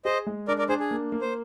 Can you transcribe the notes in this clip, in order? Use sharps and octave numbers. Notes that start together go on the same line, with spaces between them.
G#4 C5 D#5
G#3
D4 A#4 D5
A#4 D5
D4 G#4 C5
G#4
A#3
A#3
C5